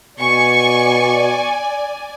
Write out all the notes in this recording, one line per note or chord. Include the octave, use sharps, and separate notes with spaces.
B2 D5 G#5 C#6